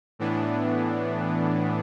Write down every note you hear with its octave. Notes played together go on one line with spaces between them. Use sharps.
A2 E3 B3 D4